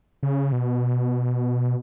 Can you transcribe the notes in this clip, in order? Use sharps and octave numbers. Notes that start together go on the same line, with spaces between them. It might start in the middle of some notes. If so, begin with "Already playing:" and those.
C#3
B2